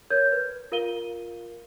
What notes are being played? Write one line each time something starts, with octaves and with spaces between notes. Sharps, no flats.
A#4 C#5 G6 G#6
B4
F4 A#4 F5 D#7 G7